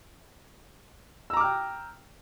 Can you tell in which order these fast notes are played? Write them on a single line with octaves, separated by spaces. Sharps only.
E6 A#5 D6 F6 G5